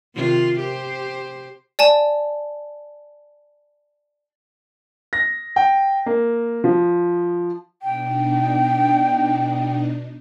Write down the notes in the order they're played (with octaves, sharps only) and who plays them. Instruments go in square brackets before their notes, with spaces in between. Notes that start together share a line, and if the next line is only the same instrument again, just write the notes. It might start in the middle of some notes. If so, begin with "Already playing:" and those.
[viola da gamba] C3 D#3 F4
G4 C5
[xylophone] D5 G#5 A5
[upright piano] A#6
G5
A#3
F3
[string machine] B2 D4 D#4 [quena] G5